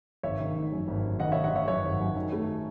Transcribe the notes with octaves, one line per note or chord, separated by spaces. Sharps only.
G#1 C#5 E5
D#3
D#3
F#2
G#1
F#2
D#3 D#5 F#5
D#3 C#5 E5
D#5 F#5
D#3 C#5 E5
F#2 C#5 E5
G#1
F#2
D#3
A3